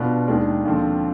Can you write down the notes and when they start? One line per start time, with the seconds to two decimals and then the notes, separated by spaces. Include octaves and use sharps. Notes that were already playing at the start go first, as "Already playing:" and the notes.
Already playing: B2 B3 D4 F4
0.27 D#2 D#3 G#3 D4
0.65 D#2 D3 F3 C4